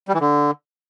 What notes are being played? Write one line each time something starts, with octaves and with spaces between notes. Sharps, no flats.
G3
E3
D3